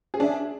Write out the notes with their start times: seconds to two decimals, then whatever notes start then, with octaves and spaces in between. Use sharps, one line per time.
0.14 G#4
0.17 C#4
0.20 D4
0.23 E5